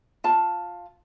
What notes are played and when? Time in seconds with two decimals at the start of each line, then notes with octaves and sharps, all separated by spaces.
0.24 F4 A5